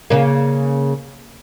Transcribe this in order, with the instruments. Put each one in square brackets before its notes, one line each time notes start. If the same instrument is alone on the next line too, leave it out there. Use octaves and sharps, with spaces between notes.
[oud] C#3 A#3